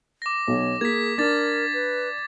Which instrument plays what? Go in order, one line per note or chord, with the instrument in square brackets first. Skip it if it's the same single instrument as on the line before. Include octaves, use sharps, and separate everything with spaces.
[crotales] D6 A#6
[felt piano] B1 [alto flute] C#5
[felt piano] A#3 [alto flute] G#4 [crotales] G#6 B6
[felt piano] D4 [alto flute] A#4 [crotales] D6 A6
[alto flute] B4